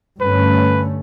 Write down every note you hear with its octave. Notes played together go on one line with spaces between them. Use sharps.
G2 D3 A3 C#4 B4